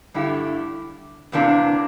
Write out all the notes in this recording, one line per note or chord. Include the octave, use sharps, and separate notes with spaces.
G2 D3 A3 E4 G4
E2 C3 E3 A#3 D4